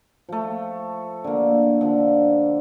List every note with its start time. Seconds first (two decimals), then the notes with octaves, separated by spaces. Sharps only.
0.29 F3 A3
1.24 D3 A#3
1.81 D3 F3